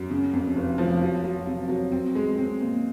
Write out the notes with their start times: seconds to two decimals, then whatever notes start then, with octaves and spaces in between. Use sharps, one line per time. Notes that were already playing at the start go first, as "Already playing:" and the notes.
Already playing: F#2
0.10 C#3
0.33 F2
0.55 F1
0.78 F3
1.02 F#3
1.24 F#3
1.47 C3
1.69 F#3
1.92 C4
2.15 G#3
2.38 C4
2.60 A#2